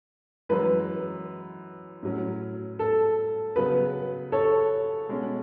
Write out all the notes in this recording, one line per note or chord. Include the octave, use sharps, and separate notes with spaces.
F#2 E3 G#3 B4
A2 F#3 C#4
A4
C#3 F#3 B3 B4
A4 C#5
B2 G#3 C#4